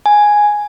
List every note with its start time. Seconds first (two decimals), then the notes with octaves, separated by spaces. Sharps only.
0.06 G#5